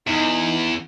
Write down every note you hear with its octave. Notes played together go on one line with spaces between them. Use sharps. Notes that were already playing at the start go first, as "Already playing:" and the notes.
E2 D#4